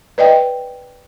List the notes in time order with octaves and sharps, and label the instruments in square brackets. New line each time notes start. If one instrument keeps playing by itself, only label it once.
[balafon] B4 D5 D#5 G5